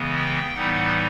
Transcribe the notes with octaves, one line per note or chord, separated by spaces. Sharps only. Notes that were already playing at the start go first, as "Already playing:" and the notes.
Already playing: C#3 E3 G#3 B3
G5
A2 E3 G3 B3 D#4 F#5